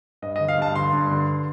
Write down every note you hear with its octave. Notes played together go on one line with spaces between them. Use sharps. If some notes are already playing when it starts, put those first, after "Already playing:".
G2 D#5
D3 D#5
F5
G2 A5
D3 C6
G2
D3